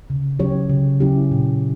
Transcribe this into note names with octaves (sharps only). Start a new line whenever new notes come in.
C#3
F#3 C#4 G4 C#5
C#3
F#3 C#4 E4 G4
A#2